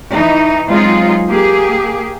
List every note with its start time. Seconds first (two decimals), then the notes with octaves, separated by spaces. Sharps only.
0.13 E3 D#4
0.67 F#3 G#3 C4 D#4 F4 G#4
1.31 A#3 G4 G#4